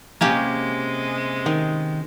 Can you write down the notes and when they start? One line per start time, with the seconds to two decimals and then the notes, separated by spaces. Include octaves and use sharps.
0.21 C3 G#3 A#3 C#4 G4
1.46 D#3